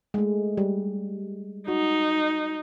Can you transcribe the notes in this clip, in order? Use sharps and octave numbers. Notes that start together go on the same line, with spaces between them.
G#3 A3
G3
D#4 F#4